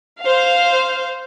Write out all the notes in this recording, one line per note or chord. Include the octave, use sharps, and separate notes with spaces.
C5 F5